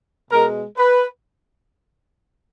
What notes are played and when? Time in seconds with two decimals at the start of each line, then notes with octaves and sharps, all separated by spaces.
0.31 B2 G#3 A#4
0.77 B4